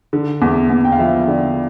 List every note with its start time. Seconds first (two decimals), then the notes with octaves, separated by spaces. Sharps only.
0.13 D3
0.42 E2
0.70 E2
0.85 G5
0.92 F5
0.99 F3 E5
1.27 D3 D5